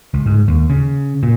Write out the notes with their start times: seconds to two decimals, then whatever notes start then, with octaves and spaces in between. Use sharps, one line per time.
0.14 C#2
0.26 G#2
0.48 D#2
0.70 C#3
1.23 A#2